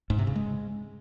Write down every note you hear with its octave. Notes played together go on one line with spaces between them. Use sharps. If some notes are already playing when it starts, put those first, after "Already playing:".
G#2
C3
C#3
G#3